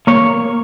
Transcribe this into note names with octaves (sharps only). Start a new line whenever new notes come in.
A#3 C#5